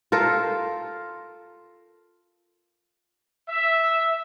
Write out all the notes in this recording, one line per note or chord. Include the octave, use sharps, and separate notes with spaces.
F4 A4 A#4 C5
E5